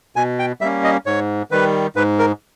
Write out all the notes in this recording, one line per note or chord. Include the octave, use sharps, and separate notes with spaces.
B2 G#5
G5
G3 A#3 C#4 E5
D#5
G#2 C#5
D#3 G3 B4
G#2 B4
A#4